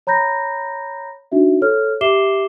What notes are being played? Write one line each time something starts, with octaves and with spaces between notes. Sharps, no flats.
C#5 A#5 B5 G6 A#6
D4 D#4 F#4 E5
A4 C#5 F6
G4 E5 D6 C7 E7 G7